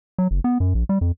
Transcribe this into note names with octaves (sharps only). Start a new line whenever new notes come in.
F#3
F#1
B3
F#2
A#1
G3
F2